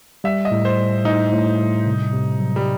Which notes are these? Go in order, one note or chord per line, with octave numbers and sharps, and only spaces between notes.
G3 E5
D#5
A2
C5
G3
A2 D#4
A2
G3
C3
C3
F#3
G3